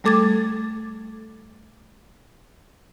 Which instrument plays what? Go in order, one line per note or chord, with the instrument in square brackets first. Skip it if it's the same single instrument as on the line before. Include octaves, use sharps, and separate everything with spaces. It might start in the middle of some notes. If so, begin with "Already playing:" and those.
[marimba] G3 A3 A4 D6 G#6 A6